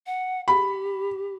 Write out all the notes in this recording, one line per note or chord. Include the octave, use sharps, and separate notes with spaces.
F#5
G4 B5